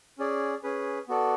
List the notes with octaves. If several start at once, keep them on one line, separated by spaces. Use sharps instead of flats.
C#4 G#4 D5
C#4 G#4 B4
B3 F#4 A4 D5